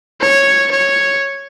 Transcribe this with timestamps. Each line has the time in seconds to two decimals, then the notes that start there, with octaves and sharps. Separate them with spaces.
0.21 C#5
0.72 C#5